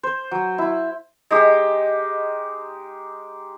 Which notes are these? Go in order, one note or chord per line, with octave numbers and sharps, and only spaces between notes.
C5
F#3
E4
G#3 D#4 G4